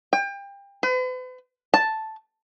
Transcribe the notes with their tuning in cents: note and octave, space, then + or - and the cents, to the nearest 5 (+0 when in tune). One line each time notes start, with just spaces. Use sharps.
G5 +30
B4 +45
A5 +0